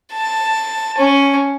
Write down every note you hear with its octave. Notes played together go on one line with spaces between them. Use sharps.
A5
C#4